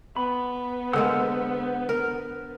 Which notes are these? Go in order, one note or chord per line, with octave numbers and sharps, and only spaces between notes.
B3 B5
D3 G#3 A#3 C5 F#5 E6
A#4